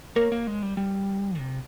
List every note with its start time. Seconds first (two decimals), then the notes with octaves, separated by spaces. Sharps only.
0.16 A#3 A#4 C#5
0.32 A#3
0.47 G#3
0.62 G3
0.77 G3
1.39 C3